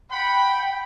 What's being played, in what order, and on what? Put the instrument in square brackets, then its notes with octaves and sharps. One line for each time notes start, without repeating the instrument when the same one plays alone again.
[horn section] F#5 B5 [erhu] G5